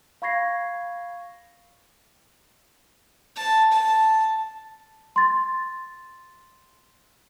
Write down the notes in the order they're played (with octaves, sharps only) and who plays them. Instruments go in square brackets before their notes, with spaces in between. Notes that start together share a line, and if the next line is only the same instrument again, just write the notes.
[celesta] F5 B5 C#6 G#6 A#6 C7
[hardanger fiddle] A5
A5
[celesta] C6 A6